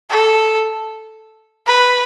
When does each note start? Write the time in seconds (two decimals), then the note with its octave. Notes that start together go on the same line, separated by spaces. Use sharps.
0.10 A4
1.67 B4